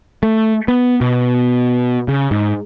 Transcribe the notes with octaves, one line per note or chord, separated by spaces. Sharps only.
A3
B3
B2
C#3
G#2